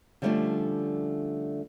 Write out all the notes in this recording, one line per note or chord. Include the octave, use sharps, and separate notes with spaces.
D3 F3 G3 A3 C#4 D4